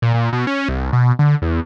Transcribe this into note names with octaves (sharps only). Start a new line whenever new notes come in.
A#2
A#2
B2
C#4
C2
B2
D3
E2